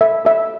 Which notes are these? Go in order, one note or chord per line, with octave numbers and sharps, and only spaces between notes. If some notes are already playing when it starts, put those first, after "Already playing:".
A4 E5
A4 E5